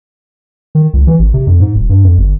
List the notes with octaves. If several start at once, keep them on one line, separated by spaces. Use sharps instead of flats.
D#3
C#2
E3
G#1
C3
F2
G#2
D#1
G2
F2
G1